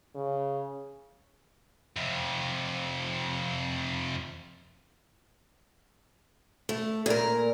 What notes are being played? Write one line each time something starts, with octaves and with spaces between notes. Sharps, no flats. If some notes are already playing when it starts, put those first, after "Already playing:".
C#3
F2 C3
A3
A#2 A#4